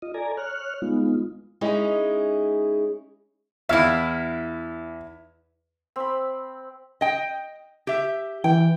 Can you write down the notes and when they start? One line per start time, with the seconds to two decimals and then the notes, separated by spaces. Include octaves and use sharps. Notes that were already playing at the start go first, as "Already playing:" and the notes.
0.02 F4 D#5
0.14 A4 D5 G#5 A#5
0.37 C#5 F6 F#6
0.82 G#3 B3 D#4 F4
1.61 G#3 C#4 D#4 E4 G#4
3.69 E2 E4 E5 F5
5.96 C4 B5
7.01 D#5 G5
7.87 G4 E5
8.44 E3 G5